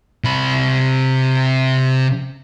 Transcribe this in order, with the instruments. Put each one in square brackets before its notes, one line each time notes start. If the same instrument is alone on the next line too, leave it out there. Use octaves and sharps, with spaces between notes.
[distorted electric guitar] C3 B5